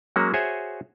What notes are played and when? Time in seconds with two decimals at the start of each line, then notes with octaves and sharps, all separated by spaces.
0.16 F#3 G#3 A#3 C#4 F#4
0.34 F#4 G#4 C5 C#5 E5 G#5